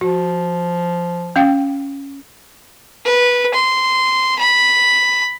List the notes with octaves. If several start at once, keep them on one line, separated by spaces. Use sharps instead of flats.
F3 F#4
C#4 F5 G5
B4
C6
B5